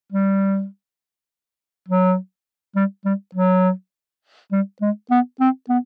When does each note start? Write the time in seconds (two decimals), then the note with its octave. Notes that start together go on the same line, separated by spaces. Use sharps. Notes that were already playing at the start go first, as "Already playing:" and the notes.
0.13 G3
1.89 F#3
2.76 G3
3.05 G3
3.35 F#3
4.52 G3
4.82 G#3
5.11 B3
5.40 C4
5.69 B3